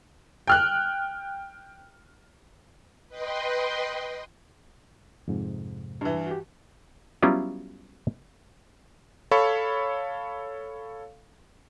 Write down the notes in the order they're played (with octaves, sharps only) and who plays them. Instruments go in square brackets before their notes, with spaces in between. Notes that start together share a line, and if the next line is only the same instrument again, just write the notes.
[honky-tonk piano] G5 F6 F#6
[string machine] B4 D#5 G5 C6
[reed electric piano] F2 G#2 C3
[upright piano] G2 E3
[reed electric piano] F#4 G4
[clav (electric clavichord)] F#3 G3 B3 C#4 E4 F4
[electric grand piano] A4 C#5 F5 B5 C#6